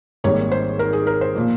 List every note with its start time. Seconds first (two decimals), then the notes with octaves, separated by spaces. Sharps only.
0.24 G#1 G#2 G3 A#3 C#5
0.52 C5
0.79 A#4
0.93 G#4
1.07 A#4
1.21 C5
1.35 A#2 F3 A#3